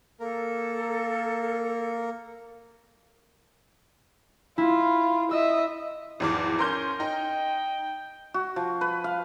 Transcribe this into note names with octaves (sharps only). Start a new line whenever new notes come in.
A#3 A4 A#4
E4 F4
D#5 E5 E6
G#1 E2 F3 D6
C#4 A#4 C6 G6
D#4 G5
F#4
F3
B4
F5